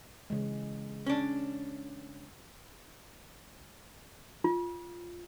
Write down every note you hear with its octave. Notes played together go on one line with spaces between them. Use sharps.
C#3 E3 G#3
C#4 D4
F4